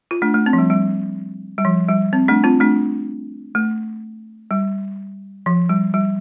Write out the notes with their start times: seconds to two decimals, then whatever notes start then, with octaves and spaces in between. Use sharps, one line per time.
0.11 F4
0.22 A3 D4
0.34 A3
0.46 C4
0.53 F3
0.58 G3
0.70 G3
1.58 G3
1.65 F3
1.89 G3
2.13 C4
2.28 A3 D4
2.44 C4 F4
2.60 A3 D4
3.55 A3
4.51 G3
5.46 F3
5.69 G3
5.94 G3